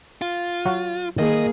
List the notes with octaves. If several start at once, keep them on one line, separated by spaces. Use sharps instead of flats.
F4
F#3 F#4 F5
D#3 A#3 G#4 D#5